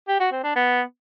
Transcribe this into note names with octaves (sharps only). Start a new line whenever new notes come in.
G4
F#4
C4
D4
B3